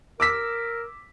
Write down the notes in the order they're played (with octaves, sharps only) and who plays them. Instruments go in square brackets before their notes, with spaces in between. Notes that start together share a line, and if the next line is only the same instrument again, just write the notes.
[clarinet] A#4 [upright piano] D6 E6 B6